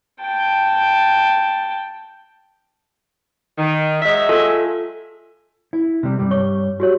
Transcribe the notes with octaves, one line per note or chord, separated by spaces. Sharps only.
G5 A5
D#3
F#3 G#3 D#5 E5 B6
F4 A4 G#5
E4
C3 G3
G2 G3
C#5 C#6
F#4 G4 C#5